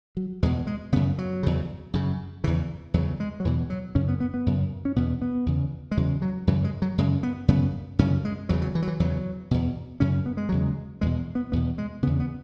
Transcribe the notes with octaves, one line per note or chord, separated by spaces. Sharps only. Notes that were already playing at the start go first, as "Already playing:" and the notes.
F#3
E2 B2 G#3
G#3
F#2 C#3 B3
F#3
E2 C#3
F#2 C#3
E2 C#3 E3
E2 C#3 F#3
G#3
F#3
E2 B2 E3
F#3
F#2 C#3 C#4
B3
B3
B3
F#2 C#3
C#4
E2 B2 B3
B3
E2 C#3
G#3
E2 C#3 F#3
F#3
F#2 C#3 E3
G#3
F#3
F#2 C#3 G#3
B3
F#2 C#3 B3
F#2 C#3 C#4
G#3
E2 C#3 F#3
F#3
E3
F#3
E3
E2 C#3 F#3
E2 B2
F#2 C#3 C#4
B3
G#3
E2 C#3 F#3
G#3
E2 B2 G#3
B3
E2 B2 B3
G#3
E2 C#3 B3
B3